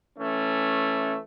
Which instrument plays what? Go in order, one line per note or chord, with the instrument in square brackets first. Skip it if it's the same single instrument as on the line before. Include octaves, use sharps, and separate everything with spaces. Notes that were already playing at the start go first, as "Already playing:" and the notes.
[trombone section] E3 A3 C#4